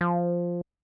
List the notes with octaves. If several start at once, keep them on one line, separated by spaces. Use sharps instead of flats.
F3